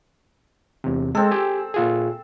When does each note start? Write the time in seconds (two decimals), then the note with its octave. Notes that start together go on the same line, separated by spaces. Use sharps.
0.84 E2 C3
1.15 G#3 C4 A4
1.31 G4 G#5
1.74 A#2 F4 G#4